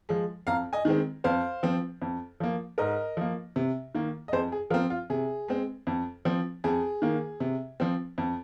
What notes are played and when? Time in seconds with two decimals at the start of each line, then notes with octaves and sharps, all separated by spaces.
0.09 F3 G#3
0.47 F2 F5 A#5
0.73 D#5 G#5
0.85 D#3 G#3 C4
1.24 F2 C5 F5
1.63 F3 C4
2.02 F2
2.40 F3 A#3
2.78 G#2 A#4 D#5
3.17 F3 A#3
3.56 C3
3.95 D#3 A#3
4.28 D#5
4.33 F2 G#4 C5
4.52 G#4
4.70 F3 F4 A#4
4.74 C4
4.90 F4
5.10 C3 G#4
5.48 G#3 C4
5.87 F2
6.25 F3 C4
6.64 F2 G#4
7.02 D#3 A#3
7.40 C3
7.80 F3 C4
8.18 F2